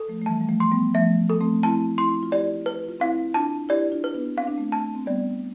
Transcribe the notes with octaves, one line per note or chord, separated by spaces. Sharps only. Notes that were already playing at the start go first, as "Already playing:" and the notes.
Already playing: A4
F3 A3
A3
E3 G3 A5
G3
F3 A3
C6
G3 B3
F3 A3 E5
A4
A3 C4
C4 E4 A5
C4 E4 C6
F4
E4 G4 D5
B4
F4
C4 E4 F5
D4 F4 A5
E4 G4 D5
D4 F4
B4
B3 D4
C4 F5
D4
A3 C4
A5
C4
G3 B3 D5